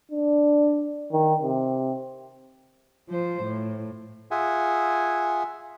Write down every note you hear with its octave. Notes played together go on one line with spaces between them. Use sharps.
D4
D#3
C3
F3 C5
A2
F4 G#4 E5 F#5 G#5